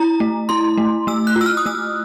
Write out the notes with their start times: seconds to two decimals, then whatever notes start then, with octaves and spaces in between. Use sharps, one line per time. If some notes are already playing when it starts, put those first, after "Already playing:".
Already playing: E4 A#5
0.20 A3
0.49 E4 C6
0.78 A3
1.07 A3 E6
1.27 F#6
1.36 F4
1.41 E6
1.46 F6
1.57 D#6
1.66 A3 E6